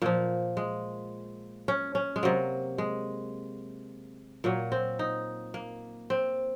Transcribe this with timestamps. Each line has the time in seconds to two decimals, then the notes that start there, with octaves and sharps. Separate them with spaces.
0.02 A#2 F3 A#3
0.57 G#3
1.68 C#4
1.95 C#4
2.16 G#3
2.23 C3 F#3 A#3
2.78 G#3
4.44 A#2 F#3 A#3
4.72 C4
4.99 D#4
5.54 A#3
6.10 C4